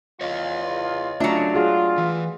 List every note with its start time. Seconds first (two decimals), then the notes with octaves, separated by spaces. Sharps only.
0.21 E2 F4 C#5 D#5
1.20 C#3 F#3 A3 D4 F4 E5
1.54 F4 F#4 G#4 F#5
1.98 E3